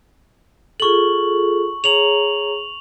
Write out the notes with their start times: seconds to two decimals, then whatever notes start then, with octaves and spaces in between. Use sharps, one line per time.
0.80 F4 G#4 A4 C#6 F#7
1.84 G#4 C#5 A#5 F7 F#7